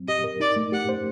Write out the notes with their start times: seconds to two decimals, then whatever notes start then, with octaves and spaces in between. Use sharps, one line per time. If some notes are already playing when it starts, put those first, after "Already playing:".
Already playing: F#3 C4
0.08 G4 D#5
0.24 A#4
0.40 D#4 D5
0.56 A3
0.72 G4 F#5
0.89 C5